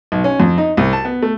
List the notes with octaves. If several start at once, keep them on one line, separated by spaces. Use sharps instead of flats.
B1
C#4
F2
D#4
C2
A5
B3
A3